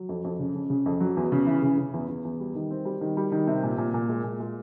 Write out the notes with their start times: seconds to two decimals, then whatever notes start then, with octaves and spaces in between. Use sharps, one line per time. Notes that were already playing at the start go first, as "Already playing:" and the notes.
Already playing: F#3
0.09 F2
0.24 F2
0.39 C#3
0.55 C#3
0.70 C#3
0.86 F2
1.00 F#3
1.17 E2
1.32 C#3
1.47 E3
1.62 C#3
1.77 C#3
1.93 E2
2.09 E2
2.25 E2
2.40 G3
2.55 D#3
2.71 C4
2.85 G3
3.01 D#3
3.17 G3
3.32 D#3
3.47 C3
3.63 A#2
3.78 A#2
3.94 A#2
4.09 G#3
4.24 A#2
4.40 G#3